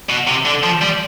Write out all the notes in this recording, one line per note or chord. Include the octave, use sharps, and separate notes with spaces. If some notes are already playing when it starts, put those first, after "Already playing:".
B2
C3
D3
F3
G3